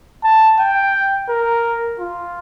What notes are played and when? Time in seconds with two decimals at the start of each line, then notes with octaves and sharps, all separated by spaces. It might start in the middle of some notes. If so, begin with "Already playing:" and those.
0.24 A5
0.59 G5
1.29 A#4
1.99 F4